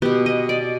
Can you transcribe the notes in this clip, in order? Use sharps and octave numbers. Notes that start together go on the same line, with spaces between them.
B2 B3 G4
D#5
D5